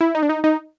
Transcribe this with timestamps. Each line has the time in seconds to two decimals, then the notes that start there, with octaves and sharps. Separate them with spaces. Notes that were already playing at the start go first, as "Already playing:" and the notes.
0.01 E4
0.15 D#4
0.23 D4
0.29 D#4
0.44 D#4